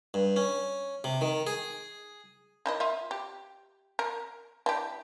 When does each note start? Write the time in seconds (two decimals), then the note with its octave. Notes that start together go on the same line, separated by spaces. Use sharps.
0.14 G2
0.36 C#4
1.04 C3
1.21 D#3
1.47 G#4
2.66 D#3 E4 D#5
2.80 F4 E5
3.11 G4
3.99 A#4
4.66 E3 D4 G4